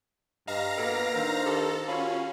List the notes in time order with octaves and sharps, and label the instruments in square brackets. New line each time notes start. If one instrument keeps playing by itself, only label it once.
[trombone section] G2 [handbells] D#5 [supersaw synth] F5 A#5 A#6
[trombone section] A#2 A#3 B3 [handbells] F#4 A4 B4
[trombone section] D#3 C5 [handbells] D4 A#4
[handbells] G4 [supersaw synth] A4
[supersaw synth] C#4 [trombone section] F4 F#4 [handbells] F5 B5